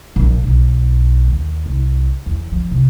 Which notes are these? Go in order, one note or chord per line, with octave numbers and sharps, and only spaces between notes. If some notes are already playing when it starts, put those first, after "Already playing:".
A#1
B1
D#2
C2
E2
F3
C3